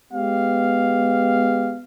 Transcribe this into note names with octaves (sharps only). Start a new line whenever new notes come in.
G#3 B3 G4 F5